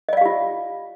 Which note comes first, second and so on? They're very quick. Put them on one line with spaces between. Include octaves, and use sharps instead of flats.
D#5 D5 F5 G4 F4